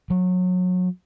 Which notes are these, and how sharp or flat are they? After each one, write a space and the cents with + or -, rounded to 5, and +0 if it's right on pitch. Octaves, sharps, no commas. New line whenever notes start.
F#3 -25